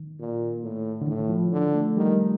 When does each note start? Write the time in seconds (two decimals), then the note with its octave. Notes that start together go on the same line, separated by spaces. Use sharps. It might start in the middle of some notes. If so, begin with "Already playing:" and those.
Already playing: D#3
0.19 A#2
0.63 A2
1.02 D3
1.08 A2 D#3
1.30 F3
1.52 D3
1.75 A3
1.97 D#3 G3